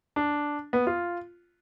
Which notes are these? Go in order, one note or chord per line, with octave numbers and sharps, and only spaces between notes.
D4
B3
F4